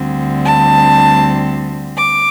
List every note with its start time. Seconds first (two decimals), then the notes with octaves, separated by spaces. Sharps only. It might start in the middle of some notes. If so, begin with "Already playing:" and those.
Already playing: D2 D3 G3 C4
0.45 A5
1.96 D6